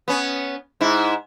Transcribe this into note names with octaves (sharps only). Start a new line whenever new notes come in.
B3 C#4
G#2 E4